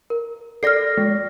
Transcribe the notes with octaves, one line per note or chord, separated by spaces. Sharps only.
A#4
A4 D5 F6 A#6 C7
G#3